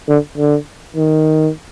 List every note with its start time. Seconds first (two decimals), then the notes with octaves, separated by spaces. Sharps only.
0.08 D3
0.38 D3
0.97 D#3